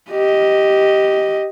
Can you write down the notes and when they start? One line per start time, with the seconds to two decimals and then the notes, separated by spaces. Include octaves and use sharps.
0.11 G4 D#5